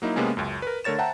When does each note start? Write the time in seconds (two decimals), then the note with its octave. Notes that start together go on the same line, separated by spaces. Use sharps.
0.02 F#3 A#3 D#4 E4
0.16 C3 G#3 A#3 B3 C#4
0.37 C#2 F#2
0.62 A#4 B4
0.84 D3 A3 A#4 C#5 A6 E7
0.98 C5 E5 F#5 G5 A5 A#5